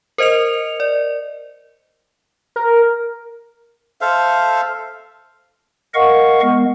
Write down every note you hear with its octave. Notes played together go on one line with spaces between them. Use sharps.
A#4 C5 D#5 C#7 F7
D5
A#4
A4 C5 E5 F5
A#4 D#5 F5 F#5 C#6
G#3 B3